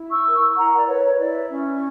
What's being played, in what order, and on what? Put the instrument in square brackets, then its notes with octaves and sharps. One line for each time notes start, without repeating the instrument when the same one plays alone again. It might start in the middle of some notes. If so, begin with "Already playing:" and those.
Already playing: [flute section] E4
C#6 E6
A#4
E4 F#5 A#5
D5
B4 C#5
E4 D5
C#4